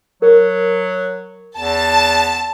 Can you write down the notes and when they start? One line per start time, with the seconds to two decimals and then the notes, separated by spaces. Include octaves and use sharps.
0.22 F#3 A#4
1.58 E2 A5